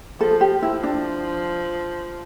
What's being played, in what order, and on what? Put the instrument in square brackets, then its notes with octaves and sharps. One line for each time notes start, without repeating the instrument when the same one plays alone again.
[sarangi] F3 [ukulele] A4
[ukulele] G4
[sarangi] F3 [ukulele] E4
[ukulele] D4